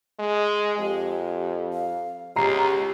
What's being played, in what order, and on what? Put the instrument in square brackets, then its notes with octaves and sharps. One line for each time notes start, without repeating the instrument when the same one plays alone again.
[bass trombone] G#3
[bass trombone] F2 [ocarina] G4
[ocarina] F5
[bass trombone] C#2 [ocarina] G4 [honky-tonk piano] A#5 C7